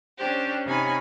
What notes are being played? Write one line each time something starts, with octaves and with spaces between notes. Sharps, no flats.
C#4 D4 G4 C5
C3 D#4 C#5 F5 G#5 B5